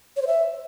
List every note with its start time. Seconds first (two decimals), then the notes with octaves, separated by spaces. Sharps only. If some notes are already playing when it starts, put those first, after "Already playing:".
0.17 C#5
0.22 C5
0.27 E5